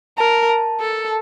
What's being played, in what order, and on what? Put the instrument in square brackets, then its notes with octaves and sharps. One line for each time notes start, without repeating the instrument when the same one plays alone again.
[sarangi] A#4 [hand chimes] A5
[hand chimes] A5
[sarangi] A4